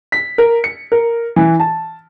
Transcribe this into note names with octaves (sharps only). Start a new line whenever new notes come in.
B6
A#4
C#7
A#4
E3
A5